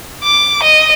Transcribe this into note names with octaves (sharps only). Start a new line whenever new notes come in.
D6
D#5